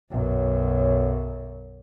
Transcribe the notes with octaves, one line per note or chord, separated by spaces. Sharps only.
B1 F#2